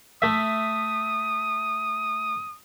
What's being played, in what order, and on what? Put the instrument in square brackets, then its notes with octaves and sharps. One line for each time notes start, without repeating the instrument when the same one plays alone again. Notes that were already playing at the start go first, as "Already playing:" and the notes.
[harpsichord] A3 E5 [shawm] D#6